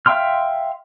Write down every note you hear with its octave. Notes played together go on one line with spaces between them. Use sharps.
E5 F5 G5 C6 F6